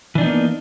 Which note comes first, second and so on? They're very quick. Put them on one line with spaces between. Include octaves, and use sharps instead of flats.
E3 D4 D#4 B3 A#3